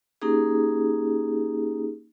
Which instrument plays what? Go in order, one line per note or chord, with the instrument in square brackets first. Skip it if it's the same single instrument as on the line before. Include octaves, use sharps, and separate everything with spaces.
[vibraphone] A#3 C#4 D#4 G4 G#4